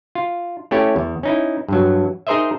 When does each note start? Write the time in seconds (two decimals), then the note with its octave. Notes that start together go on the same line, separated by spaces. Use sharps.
0.15 F4
0.71 A3 C#4 E4 G4 C#5
0.96 E2
1.23 C#4 D#4 E4
1.68 G2 F#3
2.27 D#4 G#4 A#4 C5 D#5 E5